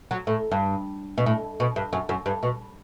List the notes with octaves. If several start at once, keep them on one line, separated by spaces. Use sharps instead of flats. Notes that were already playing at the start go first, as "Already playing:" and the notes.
F#3
A2
G2
B2
A2
B2
G2
F#2
F#2
G2
B2